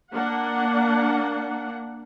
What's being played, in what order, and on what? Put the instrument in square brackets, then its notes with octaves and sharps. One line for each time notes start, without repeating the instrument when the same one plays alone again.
[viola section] A#3 D4 F#5